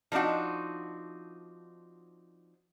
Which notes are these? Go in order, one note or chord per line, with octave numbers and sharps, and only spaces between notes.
F3 C4 D4 D#4 F#4